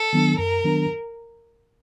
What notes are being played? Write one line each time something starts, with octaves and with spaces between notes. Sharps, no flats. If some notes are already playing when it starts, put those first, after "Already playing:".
Already playing: A4
D#3 F#3 B3 D4
F#2 A#4
D#3 F#3 B3 D4